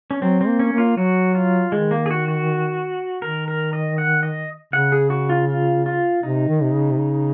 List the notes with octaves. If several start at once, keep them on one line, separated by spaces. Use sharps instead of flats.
C#4
F#3 C4
C4
A#3
C#4
A#3
F4
F#3 F#4
F4
D#3 G#3
A#3
G#4
F#4
F#4
D#3 A#4
A#4
D#5
F#5
D#5
C#3 F#5
G#4
F#4
F4
F4
F4
C3 D#4
D#3
C3
C#3
C3
C#3